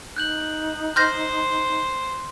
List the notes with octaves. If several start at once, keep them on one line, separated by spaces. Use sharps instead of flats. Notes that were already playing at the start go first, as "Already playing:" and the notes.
D#4 F#6 G6 F#7
C5 C6 F6 G6 A#6